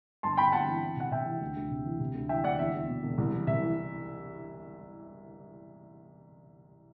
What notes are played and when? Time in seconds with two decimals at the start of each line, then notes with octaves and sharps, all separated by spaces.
0.23 G1 A5 C6
0.37 G1 G5 B5
0.52 G1 F#5 A5
0.67 E3
0.83 E3
0.96 C3 F#5
1.12 C3 E5 G5
1.26 E3
1.41 D2
1.56 D2
1.71 C3
1.85 E3
2.00 C3
2.15 D2
2.29 E3 E5 G5
2.44 D2 D5 F#5
2.59 E2 E5
2.74 E2
2.88 B2
3.03 E1
3.18 C2
3.33 E3
3.47 C2 E5
3.62 E3